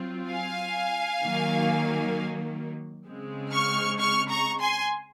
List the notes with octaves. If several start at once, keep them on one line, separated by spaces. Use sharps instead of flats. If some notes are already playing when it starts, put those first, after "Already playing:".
Already playing: F#3 C4 F4
F5 G#5
D#3 F#3 A#3
C#3 G#3 C4
C#6 F6
C#6 F6
A#5 C#6
G#5 C6